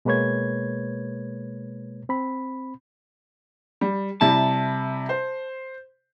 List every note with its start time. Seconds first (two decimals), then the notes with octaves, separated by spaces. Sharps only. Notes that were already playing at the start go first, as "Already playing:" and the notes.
0.05 B2 G#3 A#3 B4 C#5 G#6
2.09 C4 B5
3.81 G3
4.21 C3 G3 E4 A5
5.09 C5